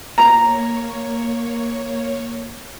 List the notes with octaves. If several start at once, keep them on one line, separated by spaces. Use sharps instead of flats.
A#3 C#5 A#5